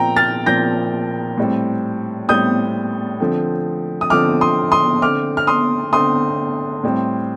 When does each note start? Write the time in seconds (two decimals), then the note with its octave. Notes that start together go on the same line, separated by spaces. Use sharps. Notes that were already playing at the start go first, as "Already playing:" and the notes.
Already playing: A#2 F3 C4 G5 A#5
0.16 F6 A6
0.46 A#2 F3 C4 G6 A#6
1.37 A2 G3 C4
2.28 A2 G3 C4 D#6 G6
3.20 D3 F3 A3 C4
4.01 D#6
4.10 D3 F3 A3 C4 D6 F6
4.41 C6 D#6
4.72 C6 D#6
5.02 D3 A3 C4 D6 F6
5.37 F6
5.47 C6 D#6
5.93 D3 A3 C4 C6 D#6
6.83 A2 G3 C4